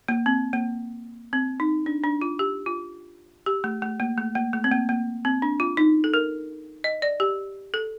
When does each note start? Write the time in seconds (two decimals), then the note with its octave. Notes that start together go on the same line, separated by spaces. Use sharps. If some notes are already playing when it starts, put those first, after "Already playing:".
0.08 A#3
0.26 C4
0.53 A#3
1.33 C4
1.60 D#4
1.86 D4
2.04 D4
2.21 F4
2.39 G4
2.66 F4
3.46 G4
3.64 A3
3.82 A3
4.00 A#3
4.18 A3
4.35 A#3
4.53 A3
4.64 C4
4.72 A#3
4.89 A#3
5.25 C4
5.42 D4
5.60 F4
5.77 D#4
6.04 A4
6.14 A#4
6.84 D#5
7.02 D5
7.20 G4
7.74 A4